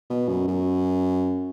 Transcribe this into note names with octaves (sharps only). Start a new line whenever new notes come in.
B2
F#2
F#2